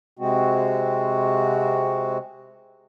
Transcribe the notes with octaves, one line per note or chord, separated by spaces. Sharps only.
C3 G#3 C4 F#4